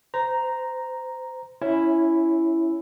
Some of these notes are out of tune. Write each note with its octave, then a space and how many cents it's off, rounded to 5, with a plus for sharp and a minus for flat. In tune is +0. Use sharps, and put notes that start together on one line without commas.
C5 -25 A#5 +0
C#4 +0 E4 +0